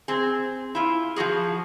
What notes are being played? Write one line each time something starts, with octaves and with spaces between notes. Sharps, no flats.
C4 G#4
E4 F4
F3 E4 F#4 G#4